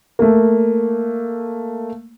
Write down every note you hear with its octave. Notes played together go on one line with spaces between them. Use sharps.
A3 A#3